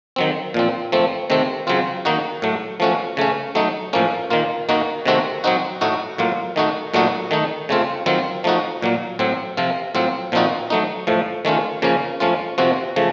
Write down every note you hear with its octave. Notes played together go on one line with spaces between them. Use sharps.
D#3 F#3 C4
A#2 F3 C4
F3 A3 C4
C3 D#3 A3 C4
C#3 F#3 C4 F4
D#3 A#3 D#4 F#4
A2 F#3 A3
F3 A3 C#4 F#4
C#3 A3 C#4
F#3 A3 D#4
A2 F3 A#3 C#4
D#3 A#3 F4
D#3 A#3 D#4 F#4
C3 D#3 A3 C4 F#4
F#3 C4 D#4 F#4
A2 A3 D#4 F#4
A2 F#3 A#3 F4
D#3 A3 D#4 F#4
A#2 F#3 A3 D#4 F#4
D#3 A3 D#4
C#3 A3 C4 F4
D#3 F#3 C4 F4
F3 A3 D#4 F#4
A#2 F#3 A#3
A2 F#3 C4
C3 F3 C4 F4
A2 F#3 C4 F4
A#2 F3 C4 D#4 F#4
F#3 A3 D#4
A2 F3 A3
D#3 A3 C#4 F4
C#3 F3 A#3 C#4
F3 A3 C#4 F4
C3 F3 C4 F#4
C#3 F3 A3